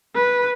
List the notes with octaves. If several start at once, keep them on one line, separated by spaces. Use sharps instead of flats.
B4